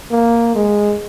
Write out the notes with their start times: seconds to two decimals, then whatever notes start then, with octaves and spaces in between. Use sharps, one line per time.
0.11 A#3
0.55 G#3